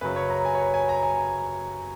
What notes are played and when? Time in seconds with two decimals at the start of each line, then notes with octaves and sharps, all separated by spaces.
0.01 F#2 C#3 F#3 B4
0.16 C#5
0.30 A#5
0.45 G#5
0.55 C#5
0.60 B4
0.74 G#5
0.89 A#5
1.03 G#5